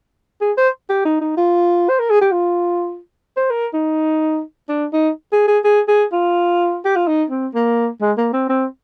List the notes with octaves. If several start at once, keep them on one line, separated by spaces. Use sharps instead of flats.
G#4
C5
G4
D#4
D#4
F4
C5
A#4
G#4
G4
F4
C5
A#4
D#4
D4
D#4
G#4
G#4
G#4
G#4
F4
G4
F4
D#4
C4
A#3
G#3
A#3
C4
C4